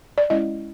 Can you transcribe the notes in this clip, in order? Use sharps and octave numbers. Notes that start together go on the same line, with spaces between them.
D5
G#3 C#4 E4 D#5